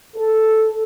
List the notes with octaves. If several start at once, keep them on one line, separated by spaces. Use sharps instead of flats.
A4